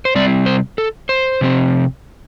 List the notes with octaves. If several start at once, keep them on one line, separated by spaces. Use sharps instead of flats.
C5
C3 G3 C4 D5
C5
A4
C5
C3 F3 C4